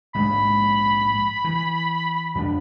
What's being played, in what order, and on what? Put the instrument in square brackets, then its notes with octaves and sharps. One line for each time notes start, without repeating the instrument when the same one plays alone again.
[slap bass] A#1 G#2 G#3 [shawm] B5
[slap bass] E3
F2 F3 D4